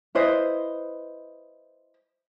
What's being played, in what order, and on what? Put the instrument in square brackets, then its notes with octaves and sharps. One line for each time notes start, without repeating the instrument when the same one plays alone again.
[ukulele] E4 B4 C5 D#5